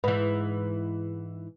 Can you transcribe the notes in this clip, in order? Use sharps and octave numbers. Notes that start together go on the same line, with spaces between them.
G#2 E3 B4